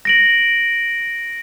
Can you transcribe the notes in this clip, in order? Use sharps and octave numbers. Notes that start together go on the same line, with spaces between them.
A#6 D7 F#7